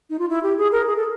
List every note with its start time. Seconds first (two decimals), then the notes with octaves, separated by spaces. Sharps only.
0.10 D#4
0.19 F4
0.29 E4
0.43 G4
0.58 G#4
0.72 A#4
0.87 G#4
0.97 A4